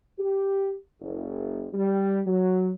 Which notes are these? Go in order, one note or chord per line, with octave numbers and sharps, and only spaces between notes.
G4
F#1
G3
F#3